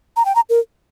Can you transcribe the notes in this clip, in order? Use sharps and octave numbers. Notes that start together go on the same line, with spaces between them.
A#5
G5
A#5
A#4